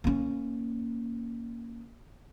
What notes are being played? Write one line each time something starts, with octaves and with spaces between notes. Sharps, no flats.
A#3 C#4